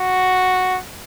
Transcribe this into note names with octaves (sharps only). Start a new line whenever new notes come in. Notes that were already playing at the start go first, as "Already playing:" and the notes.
Already playing: F#4